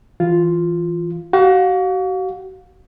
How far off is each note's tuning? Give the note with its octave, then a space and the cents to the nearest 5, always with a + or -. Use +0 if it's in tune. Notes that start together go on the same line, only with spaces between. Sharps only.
E3 +0 F4 +0
F#4 +40 F5 +35